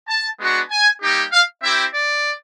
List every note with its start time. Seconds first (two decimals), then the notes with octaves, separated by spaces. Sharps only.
0.08 A5
0.39 G#3 B3 D4 F#4
0.70 G#5
1.01 G3 A#3 D#4 G4
1.32 F5
1.63 C4 E4 G4 E5
1.94 D5